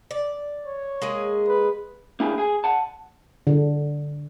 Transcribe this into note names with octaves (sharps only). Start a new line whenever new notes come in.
D5
C#5
G#3 A#3 G#4
B4
A#3 D4 E4 G4 G#4 G#5
G#4 G#5
F#5 A5
D3